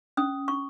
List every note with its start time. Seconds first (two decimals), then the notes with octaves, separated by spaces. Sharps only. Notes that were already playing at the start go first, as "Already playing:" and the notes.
0.17 C#4 D#6
0.48 C#6